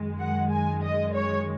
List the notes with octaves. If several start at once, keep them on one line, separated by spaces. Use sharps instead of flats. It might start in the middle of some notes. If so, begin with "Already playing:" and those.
Already playing: F#2 D#3 G#3
F#5
G#5
D#5
C#5